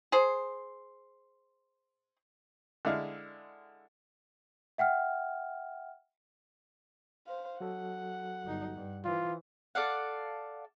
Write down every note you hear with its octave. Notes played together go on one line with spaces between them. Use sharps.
G#4 C5
D3 G#3 E4 F5
E5 F#5 G5 F6
C5 F5
F#3 F#4 A4 F#5
G1 D#4
G2
E3 F4 C5
A4 D5 F5 F#5